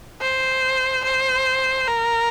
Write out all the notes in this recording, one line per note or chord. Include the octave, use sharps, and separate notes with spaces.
C5
C5
A#4